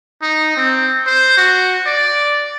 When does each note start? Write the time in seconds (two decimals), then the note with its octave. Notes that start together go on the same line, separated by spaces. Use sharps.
0.22 D#4
0.57 C4
1.07 C5
1.37 F#4
1.86 D5